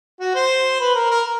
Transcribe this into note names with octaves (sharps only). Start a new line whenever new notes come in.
F#4
C5
B4
A#4
A#4